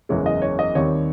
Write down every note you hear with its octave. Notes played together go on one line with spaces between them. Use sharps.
F#1 E2 C#3 E3 G#3 C#5
D#5
C#5
D#5
D#2 D#3 G3 C4 C#5